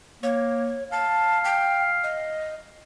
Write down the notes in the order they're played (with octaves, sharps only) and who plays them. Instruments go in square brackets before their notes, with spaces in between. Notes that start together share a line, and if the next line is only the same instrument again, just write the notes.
[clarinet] A#3 [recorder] C#5
[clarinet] F5 [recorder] A5
[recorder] G5
D#5